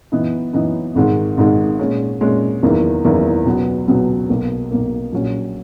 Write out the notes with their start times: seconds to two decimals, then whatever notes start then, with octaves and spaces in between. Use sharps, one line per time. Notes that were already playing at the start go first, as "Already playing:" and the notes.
0.12 F#2 E3 B3 D#4
0.53 F#2 E3 B3 D#4
0.95 G#1 G#2 D#3 G#3
1.37 G#1 G#2 D#3 G#3
1.79 A#2 G#3 C#4
2.21 A#2 G#3 C#4
2.62 F#1 E2 D#3 A#3 E4
3.04 F#1 E2 D#3 A#3 E4
3.45 C#2 B2 F#3 B3
3.88 C#2 B2 F#3 B3
4.29 B1 B2 A#3
4.71 B1 B2 A#3
5.12 A#1 A#2 F#3 C#4